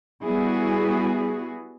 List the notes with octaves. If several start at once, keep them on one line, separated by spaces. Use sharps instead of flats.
G3 B3 E4 F#4 G#4